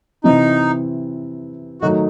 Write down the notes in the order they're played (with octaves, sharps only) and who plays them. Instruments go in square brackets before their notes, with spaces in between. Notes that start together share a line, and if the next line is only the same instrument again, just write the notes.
[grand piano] C3 E3 C4 [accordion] D#4
[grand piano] D#3 F#3 A3 D#4 [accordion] F#4